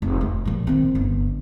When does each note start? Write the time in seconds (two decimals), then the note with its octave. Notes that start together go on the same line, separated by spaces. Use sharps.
0.02 F1
0.21 A3
0.45 A#2 F3
0.67 D#3 C4
0.95 G1